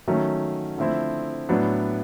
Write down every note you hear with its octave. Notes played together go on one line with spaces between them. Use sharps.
D#3 F#3 A3 C#4
D3 F3 A3 C4 E4
A2 F#3 B3 D4